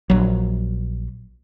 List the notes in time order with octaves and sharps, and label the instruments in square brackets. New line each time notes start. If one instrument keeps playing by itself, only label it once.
[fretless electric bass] A#1 F#3